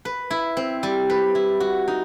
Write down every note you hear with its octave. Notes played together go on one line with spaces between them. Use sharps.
B4
E4
C4
G3
B4
E4
F#4
D#4